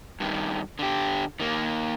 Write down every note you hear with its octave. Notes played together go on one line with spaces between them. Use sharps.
G2 D#3
D3 G4
D#3 A#3